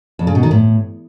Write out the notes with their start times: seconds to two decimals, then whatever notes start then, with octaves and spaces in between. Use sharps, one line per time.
0.19 F2
0.27 C#3
0.35 B2
0.43 D#3
0.51 A2